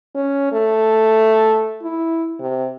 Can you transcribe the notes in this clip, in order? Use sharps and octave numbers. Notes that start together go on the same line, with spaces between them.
C#4
A3
E4
C3